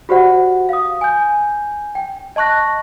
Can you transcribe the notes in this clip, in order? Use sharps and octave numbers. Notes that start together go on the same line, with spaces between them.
F#4 G4 C5 D5 F#5
F5 D#6
G#5 G6
G5
D#5 A5 C#6 F#6 A#6